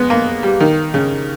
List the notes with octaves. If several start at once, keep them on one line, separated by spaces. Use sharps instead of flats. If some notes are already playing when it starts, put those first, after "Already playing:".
Already playing: G#3 B3
A#3
G3
D#3
C#3